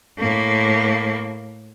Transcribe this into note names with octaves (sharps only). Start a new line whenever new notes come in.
A2 A#3